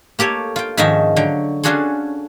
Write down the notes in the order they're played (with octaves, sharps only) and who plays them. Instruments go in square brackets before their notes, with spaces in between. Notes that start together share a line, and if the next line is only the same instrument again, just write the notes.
[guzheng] A#3 G4 A4 C#5
F4 G5
G#2 D#3 F3 C#4 D#4 E5
D3 F#3 G5
C#4 D4 F4 F#4 G#4 A4